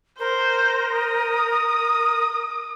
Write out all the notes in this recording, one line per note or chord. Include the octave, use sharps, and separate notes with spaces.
A#4 C5
D#6